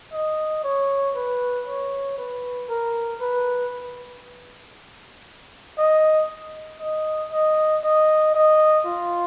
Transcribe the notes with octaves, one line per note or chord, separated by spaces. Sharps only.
D#5
C#5
B4
C#5
B4
A#4
B4
D#5
D#5
D#5
D#5
D#5
F4